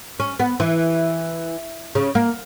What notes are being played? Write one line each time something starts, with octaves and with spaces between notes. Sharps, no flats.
C#4
B3
E3
C#3
A#3